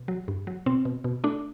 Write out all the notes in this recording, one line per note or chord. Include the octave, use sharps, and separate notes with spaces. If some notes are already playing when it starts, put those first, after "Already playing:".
Already playing: B2
F#3
G2
F#3
B2 C4
B2
B2
A3 D4